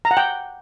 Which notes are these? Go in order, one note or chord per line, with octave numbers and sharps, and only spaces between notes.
A#5
F#5
G5